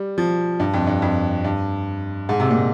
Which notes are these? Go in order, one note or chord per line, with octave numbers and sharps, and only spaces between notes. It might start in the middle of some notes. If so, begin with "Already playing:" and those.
Already playing: G3
F3
G2
F2
G2
F2
G2
G#2
C3
A#2